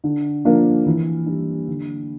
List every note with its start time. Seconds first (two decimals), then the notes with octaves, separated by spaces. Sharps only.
0.04 D3
0.45 F3 A#3 D4
0.86 E3
1.26 G3 D4
1.68 D3